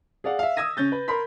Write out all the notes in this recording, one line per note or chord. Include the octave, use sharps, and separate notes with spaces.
G#4 D5 F5 F#5
E5 F5
D#6 E6 G#6 A#6 D#7
C#3 C#4 G6 A6
B4
A#4 B5 C6 B6